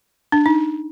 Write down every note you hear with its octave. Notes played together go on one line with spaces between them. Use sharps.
D4
D#4